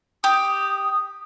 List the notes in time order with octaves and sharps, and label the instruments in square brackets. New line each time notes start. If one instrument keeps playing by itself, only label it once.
[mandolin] G4 [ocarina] D#6